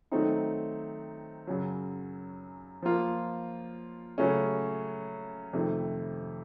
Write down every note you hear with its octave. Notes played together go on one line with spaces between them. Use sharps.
D#3 F#3 A3 C4 D#4
F#2 C#3 F#3
F3 A#3 F4
C#3 F#3 A3 C#4
F2 C3 D#3 A3